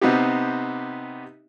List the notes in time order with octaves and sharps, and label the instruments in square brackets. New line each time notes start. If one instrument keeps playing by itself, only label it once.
[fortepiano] C3 B3 C4 D#4 G4